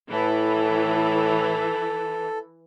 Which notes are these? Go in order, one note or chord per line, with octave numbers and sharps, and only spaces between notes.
A2 E3 A4